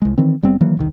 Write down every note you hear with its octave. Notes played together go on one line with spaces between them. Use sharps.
C2 G#3
D#3 E3 C4
F#1 G3 B3 C4
D#3 E3 F#3 A#3
E1 C2 D#3